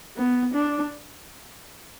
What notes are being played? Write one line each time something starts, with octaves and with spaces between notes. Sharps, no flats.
B3
D4